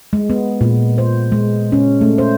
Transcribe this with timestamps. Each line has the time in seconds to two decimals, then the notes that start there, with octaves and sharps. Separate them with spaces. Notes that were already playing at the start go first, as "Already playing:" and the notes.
0.13 G#3
0.30 B3
0.61 A#2
0.98 C5
1.32 G#3
1.72 C#4
2.01 A3
2.18 C5